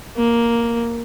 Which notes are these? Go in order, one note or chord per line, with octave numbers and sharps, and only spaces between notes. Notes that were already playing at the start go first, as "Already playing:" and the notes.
A#3